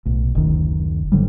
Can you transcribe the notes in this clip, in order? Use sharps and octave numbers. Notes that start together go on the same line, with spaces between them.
B1 A2
F#1 D2 D#3
G#2 D3 F#3 G3